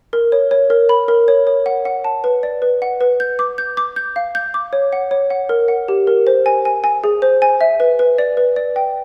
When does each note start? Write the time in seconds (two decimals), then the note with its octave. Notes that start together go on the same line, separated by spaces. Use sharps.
0.13 A#4
0.32 C#5
0.51 C#5
0.70 A#4
0.89 B5
1.08 A#4
1.28 C#5
1.47 C#5
1.66 F#5
1.85 F#5
2.04 A5
2.24 B4
2.43 D5
2.62 B4
2.82 F#5
3.01 B4
3.20 G6
3.39 D6
3.58 G6
3.77 D6
3.96 G6
4.16 F5
4.35 G6
4.54 D6
4.73 C#5
4.93 F#5
5.11 C#5
5.30 F#5
5.49 A#4
5.68 F#5
5.88 G4
6.07 A#4
6.27 C5
6.46 G#5
6.65 G#5
6.84 G#5
7.04 G#4
7.22 C5
7.42 G#5
7.61 E5
7.80 B4
7.99 B4
8.18 D5
8.37 B4
8.56 D5
8.76 G5